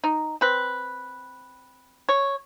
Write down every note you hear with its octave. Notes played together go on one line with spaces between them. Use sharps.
D#4
C4 B4
C#5